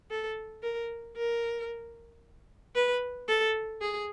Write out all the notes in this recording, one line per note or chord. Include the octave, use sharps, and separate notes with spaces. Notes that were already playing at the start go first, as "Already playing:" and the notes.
A4
A#4
A#4
B4
A4
G#4